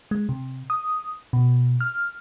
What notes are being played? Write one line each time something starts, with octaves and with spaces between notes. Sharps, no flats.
G#3
C3
D#6
B2
F6